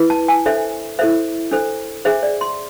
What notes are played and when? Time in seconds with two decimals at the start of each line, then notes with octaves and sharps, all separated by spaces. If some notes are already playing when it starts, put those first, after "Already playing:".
Already playing: E4 B4
0.10 A5
0.28 G#5
0.46 D4 A4 C5 E5
0.99 E4 A4 C5 E5
1.51 D4 A4 C5
2.05 D4 G#4 C5 E5
2.23 D5
2.41 C6